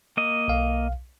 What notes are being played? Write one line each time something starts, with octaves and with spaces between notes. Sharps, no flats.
A#3 D#5
B1 F5